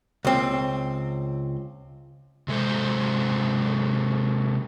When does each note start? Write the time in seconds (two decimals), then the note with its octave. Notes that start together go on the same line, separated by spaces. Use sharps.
0.25 C#2 C4
2.48 C3 G#3 A4 C5